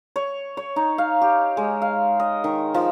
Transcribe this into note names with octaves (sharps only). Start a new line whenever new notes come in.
C#5
C#5
D#4
F5
G4
G#3
F5
D#5
D#3
F3